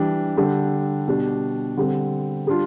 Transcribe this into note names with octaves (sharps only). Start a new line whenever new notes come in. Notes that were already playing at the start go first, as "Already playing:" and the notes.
Already playing: E3 G3 D4 G4
D3 G3 D4 G4
B2 G3 D4 G4
D3 G3 C4
G3 D4 F4